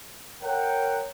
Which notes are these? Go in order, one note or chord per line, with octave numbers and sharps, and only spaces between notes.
A#4 C#5 F#5 G5